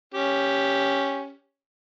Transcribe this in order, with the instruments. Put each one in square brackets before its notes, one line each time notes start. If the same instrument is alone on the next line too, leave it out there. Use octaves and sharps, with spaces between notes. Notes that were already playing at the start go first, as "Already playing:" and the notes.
[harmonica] C#4 G4